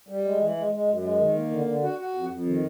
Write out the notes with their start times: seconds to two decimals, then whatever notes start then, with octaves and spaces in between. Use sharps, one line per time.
0.08 G3
0.25 G#3
0.41 E3
0.56 G#3
0.72 G#3
0.89 F#2
1.04 G#3
1.20 D#3
1.36 A#3
1.51 D3
1.67 D3
1.83 F#4
1.99 F#4
2.14 F2
2.31 F2
2.46 D#3